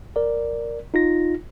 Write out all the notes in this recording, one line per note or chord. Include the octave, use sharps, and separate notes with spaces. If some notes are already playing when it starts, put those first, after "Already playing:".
A#4 D5
D#4 F4 A#6